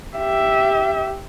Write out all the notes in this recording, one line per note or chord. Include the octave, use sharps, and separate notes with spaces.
G4 E5